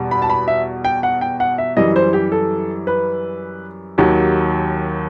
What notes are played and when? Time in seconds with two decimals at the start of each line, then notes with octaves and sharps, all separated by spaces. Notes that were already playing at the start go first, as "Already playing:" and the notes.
Already playing: E2 B2 G3
0.11 B5
0.22 A5
0.30 B5
0.48 E5
0.85 G5
1.03 F#5
1.21 G5
1.40 F#5
1.58 E5
1.77 F#2 E3 G3 D#5
1.96 C5
2.13 G4
2.32 A4
2.87 B4
3.98 D#2 D#3 F#3 G4